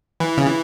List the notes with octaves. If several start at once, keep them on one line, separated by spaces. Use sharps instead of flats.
E3
C#3
E3